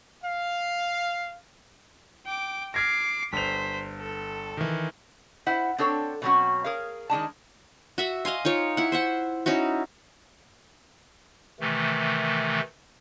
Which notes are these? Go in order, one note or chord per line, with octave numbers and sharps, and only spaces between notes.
F5
G5 D6
D6 F6 G#6 A#6 C7
G1 C5 B6 F7
A4
D#3 E3
E4 C5 F#5
C4 D4 A4 C#5
B2 D3 F#3 C4 C#4 F#4
G#4 A#4 C#5 F5
D#3 G#3 D4 A5
F#4 E5 F#5
D#5 F5 G#5 C6
D#4 F4 C#5
E4 F#5
C5 E5 F#5
C#4 D#4 E4 F#4
C3 D#3 E3 A3